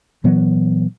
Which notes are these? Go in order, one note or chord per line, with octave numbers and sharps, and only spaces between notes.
A#2 E3 F#3 B3